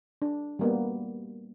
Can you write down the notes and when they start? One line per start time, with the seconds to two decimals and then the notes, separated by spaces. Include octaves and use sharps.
0.22 D4
0.59 G3 A#3 B3